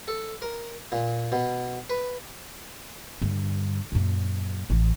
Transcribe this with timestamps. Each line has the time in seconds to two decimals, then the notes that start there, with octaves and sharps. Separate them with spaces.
0.08 A4
0.42 A#4
0.92 A#2
1.32 B2
1.90 B4
3.22 G2 D3
3.92 F#2 A#2
4.70 A1 E3